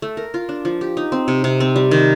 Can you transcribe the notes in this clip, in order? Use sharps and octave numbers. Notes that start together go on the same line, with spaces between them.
A3
A#4
F4
D4
F3
G4
D#4
C4
C3
C3
C4
G3
D#3